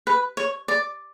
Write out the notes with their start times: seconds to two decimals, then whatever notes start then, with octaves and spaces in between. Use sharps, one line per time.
0.07 B4
0.37 C#5
0.68 D5